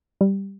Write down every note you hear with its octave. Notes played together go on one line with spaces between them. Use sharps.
G3